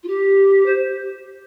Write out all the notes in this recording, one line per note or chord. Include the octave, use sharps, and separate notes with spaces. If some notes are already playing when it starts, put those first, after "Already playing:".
F4
G4
C5